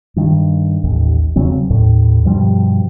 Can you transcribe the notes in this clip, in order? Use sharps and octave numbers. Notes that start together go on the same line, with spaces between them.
G2 D#3
A1 D#2
E2 C#3 F#3 C4
D#2 A2
G2 B2 F3 G3